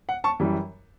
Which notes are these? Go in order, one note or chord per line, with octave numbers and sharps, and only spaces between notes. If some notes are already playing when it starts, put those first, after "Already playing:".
F#5
A5 C#6
F#2 E3 G3